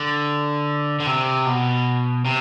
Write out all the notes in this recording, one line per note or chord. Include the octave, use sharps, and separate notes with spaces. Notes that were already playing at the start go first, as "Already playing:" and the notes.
Already playing: D3
D3
C3
B2
C3